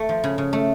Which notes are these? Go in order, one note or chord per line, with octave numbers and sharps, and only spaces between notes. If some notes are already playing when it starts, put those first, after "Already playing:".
Already playing: A3
F3
C#3
C#3
A3